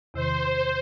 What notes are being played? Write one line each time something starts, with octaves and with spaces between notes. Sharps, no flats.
E2 C3 D#3 C5